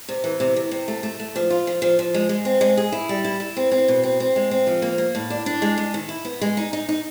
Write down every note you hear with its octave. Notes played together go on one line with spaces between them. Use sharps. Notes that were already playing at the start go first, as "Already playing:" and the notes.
C3
E3
C3
C3
C3
A3
A3
A3
F3
F4
F3
F3
F3
G#3
G#3
C4
G#3
G#4
E4
G3
E4
E4
C4
C4
B2
C4
C4
G#3
C4
F3
A#3
A#3
A2
D4
D4
G#3
G#3
D#3
E4
B3
G#3
D#4
D#4
D#4